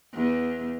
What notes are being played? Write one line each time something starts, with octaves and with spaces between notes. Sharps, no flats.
E2